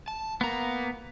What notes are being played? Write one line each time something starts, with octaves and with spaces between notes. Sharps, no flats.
A5
A#3 B3 A#4 A#5